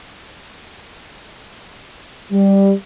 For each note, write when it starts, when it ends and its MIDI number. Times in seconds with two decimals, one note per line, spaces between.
2.31 2.72 55